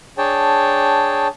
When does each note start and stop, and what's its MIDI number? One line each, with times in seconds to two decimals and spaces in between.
0.18 1.28 62
0.18 1.28 68
0.18 1.28 73
0.18 1.28 79
0.18 1.28 81